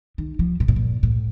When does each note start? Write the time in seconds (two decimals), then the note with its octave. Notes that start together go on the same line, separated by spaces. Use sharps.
0.18 D#3
0.39 F3
0.60 A#2
0.68 A2
0.76 A#2
1.03 A2